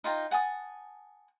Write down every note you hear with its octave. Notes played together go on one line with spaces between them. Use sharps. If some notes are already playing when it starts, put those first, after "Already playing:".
D#4 F4 G5 A#5
F#5 G#5 A5 D#6